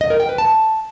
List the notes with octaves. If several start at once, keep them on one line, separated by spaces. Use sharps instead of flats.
D#5
A#4
G5
B4
A5